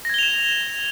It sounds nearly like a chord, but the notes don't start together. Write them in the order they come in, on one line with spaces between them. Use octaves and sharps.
A#6 G#6 G7 F7 E7